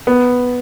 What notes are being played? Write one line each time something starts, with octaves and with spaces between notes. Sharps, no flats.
B3